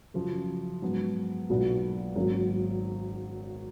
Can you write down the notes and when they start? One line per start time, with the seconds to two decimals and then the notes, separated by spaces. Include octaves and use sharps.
0.14 F#2 C#3 F3
0.82 G#2 F#3 B3
1.49 B1 A#2 F#3 B3
2.15 G#1 F#3 A#3 C#4